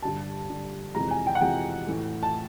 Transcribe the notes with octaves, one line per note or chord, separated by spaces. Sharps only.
G2 D3 G3 A5
G2 D3 G3
F2 C3 E3 G#3 A#5
G#5
G5
F#5
F2 C3 E3 G#3 G5
A2 E3 A3
A5